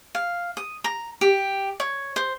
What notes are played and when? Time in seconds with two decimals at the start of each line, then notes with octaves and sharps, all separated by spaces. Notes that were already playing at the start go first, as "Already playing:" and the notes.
0.15 F5
0.57 D#6
0.84 A#5
1.21 G4
1.80 C#5
2.16 C5